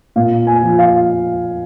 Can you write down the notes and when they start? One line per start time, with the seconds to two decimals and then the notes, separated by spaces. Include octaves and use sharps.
0.16 A#2 F5
0.47 G#5
0.63 F3
0.79 F5